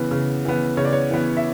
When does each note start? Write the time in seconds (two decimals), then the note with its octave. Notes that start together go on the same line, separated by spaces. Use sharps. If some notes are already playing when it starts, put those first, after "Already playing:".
Already playing: C#3 E3 B3
0.11 C#3
0.45 E3 B3
0.77 C#3 C#5
0.85 D5
0.93 C#5
1.10 E3 B3
1.37 E5